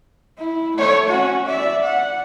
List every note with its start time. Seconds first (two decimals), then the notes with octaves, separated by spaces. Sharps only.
0.38 E4
0.76 A3 C#5
1.09 C#4 F#4
1.47 D5 E5
1.83 F#5